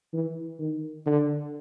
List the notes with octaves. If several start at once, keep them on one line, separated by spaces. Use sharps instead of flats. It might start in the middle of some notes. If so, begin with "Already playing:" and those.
E3
D#3
D3